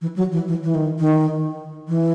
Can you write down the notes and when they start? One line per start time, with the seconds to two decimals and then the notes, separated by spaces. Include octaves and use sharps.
0.01 E3
0.16 F#3
0.32 E3
0.48 E3
0.64 E3
0.75 D#3
0.99 D#3
1.88 E3